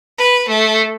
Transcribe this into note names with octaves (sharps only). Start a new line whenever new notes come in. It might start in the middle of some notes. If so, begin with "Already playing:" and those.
B4
A3